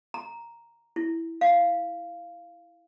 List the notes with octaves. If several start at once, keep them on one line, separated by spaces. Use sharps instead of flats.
A#5
E4
F5